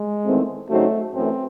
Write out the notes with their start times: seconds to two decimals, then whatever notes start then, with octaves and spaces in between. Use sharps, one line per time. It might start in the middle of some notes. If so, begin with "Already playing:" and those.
Already playing: G#3
0.25 E2 D#3 A3 C4
0.69 C#3 F#3 A3 C4 D#4 F#4
1.14 F#2 E3 A3 C4